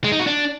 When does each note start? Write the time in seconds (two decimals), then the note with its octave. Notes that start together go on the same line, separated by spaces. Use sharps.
0.04 G#3
0.12 D#4
0.19 F#4
0.27 D4